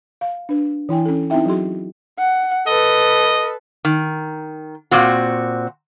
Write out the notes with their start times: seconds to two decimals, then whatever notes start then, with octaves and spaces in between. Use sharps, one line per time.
0.21 F5
0.49 D4 B4
0.89 E3 E4 G5 G#5
1.05 C#4 A4
1.30 C4 D#4 E4 E5 G5
1.46 F#3 F#4 G#4 C6
2.19 F#5
2.67 A4 B4 D#5
3.85 D#3
4.91 A#2 C4 F#4